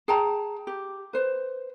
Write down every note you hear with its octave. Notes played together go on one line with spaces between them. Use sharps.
G#4 G5 A5 A#5
G4
B4 C5